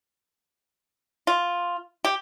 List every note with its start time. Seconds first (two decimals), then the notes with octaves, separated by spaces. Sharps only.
1.27 F4
2.05 G4